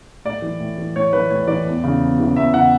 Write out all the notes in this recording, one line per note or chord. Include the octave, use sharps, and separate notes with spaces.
A2 D5
E3
A2
E3
A2 C#5
E3 B4
A2 C#5
E3 D5
E2
C#3 E3
E2
C#3 E3
E2 E5
C#3 E3 F#5